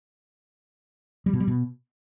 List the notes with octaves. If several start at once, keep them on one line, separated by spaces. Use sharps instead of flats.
G3
B2
G3
B2